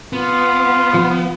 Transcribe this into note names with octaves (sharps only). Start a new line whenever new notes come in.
B3 F4
F3